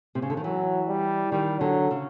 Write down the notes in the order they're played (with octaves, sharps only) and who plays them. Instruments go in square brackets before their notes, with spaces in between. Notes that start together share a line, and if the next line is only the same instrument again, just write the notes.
[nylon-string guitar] C3
C#3
D3
D#3
[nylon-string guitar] E3 [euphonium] F#3
[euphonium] G3
[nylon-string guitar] D#3 [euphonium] G3
[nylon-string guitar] D3 [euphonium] F#3
[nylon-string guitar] C#3